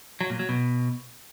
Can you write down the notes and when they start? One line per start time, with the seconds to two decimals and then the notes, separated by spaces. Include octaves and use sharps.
0.21 F#3
0.30 A#2
0.39 F#3
0.49 B2